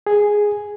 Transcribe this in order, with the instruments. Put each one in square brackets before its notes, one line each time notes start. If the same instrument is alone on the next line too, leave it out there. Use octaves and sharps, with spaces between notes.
[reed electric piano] G#4